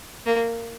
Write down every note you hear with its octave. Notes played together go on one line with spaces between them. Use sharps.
A#3